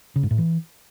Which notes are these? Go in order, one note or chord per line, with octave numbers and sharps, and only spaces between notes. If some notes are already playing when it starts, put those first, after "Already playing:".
C#3
G#2
A2
E3